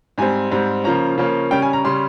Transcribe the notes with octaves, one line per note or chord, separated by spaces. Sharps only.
G#2 G3 C4 G#5
G#2 G3 C4
C#3 F3 A#3 C#4 A#5
C#3 F3 A#3 C#4
C#3 G3 C#4 G5
G#5
A#5
C#3 G3 C#4 C6